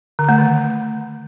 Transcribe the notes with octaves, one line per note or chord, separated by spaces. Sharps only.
D3
A3
D#3